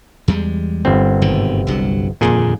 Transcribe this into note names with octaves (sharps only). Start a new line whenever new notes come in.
E2 G3 G#3
G1 C4
G#1 B2 D#3
C2 G2 F#3
D#1 F2 A#2 D3 G#4